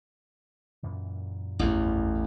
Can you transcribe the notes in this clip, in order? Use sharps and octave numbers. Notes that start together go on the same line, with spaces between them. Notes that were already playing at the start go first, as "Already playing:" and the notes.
F#2 A#2 E3
A1 E2